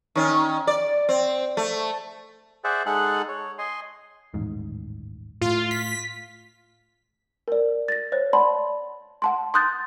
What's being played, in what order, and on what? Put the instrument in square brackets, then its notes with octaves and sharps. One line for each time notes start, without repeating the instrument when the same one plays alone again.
[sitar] D#3 C#4
D5
C4
A3
[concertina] G#4 C5 D5 E5 F#5
G#3 D#4 G#4 A4 F#5 F#6
C#5
D#5 G#5 C6
[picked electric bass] D#1 A1 G#2
[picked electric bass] A2 A3 [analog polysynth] F4
[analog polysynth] B6
[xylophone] A#4 D5
A6 A#6
C5 C#5 F#6
D5 F#5 A5 B5 C6
F#5 A5 C6
C6 D#6 F#6 G6 A6